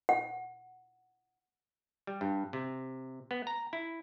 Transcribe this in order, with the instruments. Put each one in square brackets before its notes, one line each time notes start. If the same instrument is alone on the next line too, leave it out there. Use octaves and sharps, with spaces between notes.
[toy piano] F#5
[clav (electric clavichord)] G3
G2
C3
B3
A#5
E4